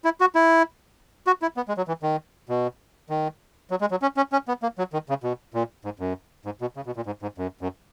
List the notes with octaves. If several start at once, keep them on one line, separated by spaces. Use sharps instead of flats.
E4
F#4
E4
F#4
E4
B3
G#3
F#3
E3
D#3
B2
D#3
F#3
G#3
F#3
C#4
C#4
C#4
B3
A#3
F#3
D#3
C#3
B2
A#2
G#2
F#2
G#2
B2
C#3
B2
A#2
G#2
G#2
F#2
F#2